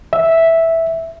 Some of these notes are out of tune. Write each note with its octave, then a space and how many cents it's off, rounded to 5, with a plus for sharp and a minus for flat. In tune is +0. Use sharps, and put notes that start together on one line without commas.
E5 -5